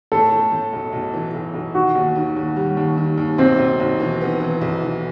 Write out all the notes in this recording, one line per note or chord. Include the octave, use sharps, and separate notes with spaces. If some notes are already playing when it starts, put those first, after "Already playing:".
A2 A4
A2
A2
B1
B1
E3
B1
B1
D#3 F#4
D#2
D#3
D#2
G3
D#2
D#3
D#2
B1 C4
B1
B1
E3
B3
E3
B1
E3